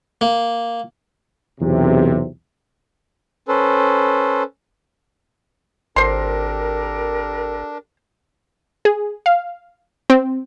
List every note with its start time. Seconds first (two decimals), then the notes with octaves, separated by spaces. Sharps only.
0.21 A#3
1.61 B1 E2 C3
3.48 C#4 A4 B4 C5
5.96 G#1 D4 G4 A4 A#4 C5 C6
8.85 G#4
9.26 F5
10.10 C4